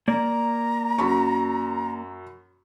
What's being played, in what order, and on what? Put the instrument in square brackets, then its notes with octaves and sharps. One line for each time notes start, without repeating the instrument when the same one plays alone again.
[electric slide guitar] A#3 A#4 D5 [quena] A#5
[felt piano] F#2 B5 C#6